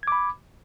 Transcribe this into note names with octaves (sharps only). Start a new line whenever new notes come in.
B5 D6 G#6